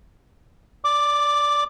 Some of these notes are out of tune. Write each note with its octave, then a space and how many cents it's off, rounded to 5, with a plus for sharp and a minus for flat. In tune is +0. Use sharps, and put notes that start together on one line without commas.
D5 -15 D6 +5